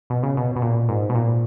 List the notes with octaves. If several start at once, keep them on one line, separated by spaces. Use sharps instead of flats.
B2
C#3
B2
B2
A#2
G#2
B2
A#2